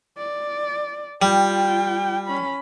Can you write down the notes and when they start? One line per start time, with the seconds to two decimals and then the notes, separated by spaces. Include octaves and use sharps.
0.17 D5
1.22 G3 F4 G5
2.28 C#4 B5